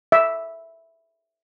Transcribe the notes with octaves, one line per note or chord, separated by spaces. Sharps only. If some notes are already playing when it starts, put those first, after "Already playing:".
E5